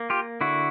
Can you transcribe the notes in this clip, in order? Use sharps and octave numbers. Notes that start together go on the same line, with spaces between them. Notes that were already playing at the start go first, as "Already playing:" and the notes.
Already playing: A#3
F4 G4
D3 E4 F#4